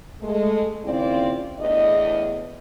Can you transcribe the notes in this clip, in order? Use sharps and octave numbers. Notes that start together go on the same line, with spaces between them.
G#3 A3 A4
D#2 C#3 C4 E4 F4 D5
E2 A2 D4 D#5